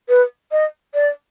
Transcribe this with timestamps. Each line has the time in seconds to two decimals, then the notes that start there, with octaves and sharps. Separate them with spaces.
0.09 B4
0.52 D#5
0.94 D5